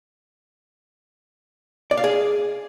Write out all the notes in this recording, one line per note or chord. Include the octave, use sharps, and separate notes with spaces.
D5
F5
G#4